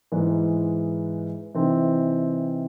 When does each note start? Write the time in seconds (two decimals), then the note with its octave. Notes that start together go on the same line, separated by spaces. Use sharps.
0.12 G#2 E3 G#3
1.54 C3 E3 C4 D#4